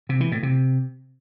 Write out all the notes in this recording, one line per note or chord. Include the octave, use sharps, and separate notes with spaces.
C3
E3
A2
C3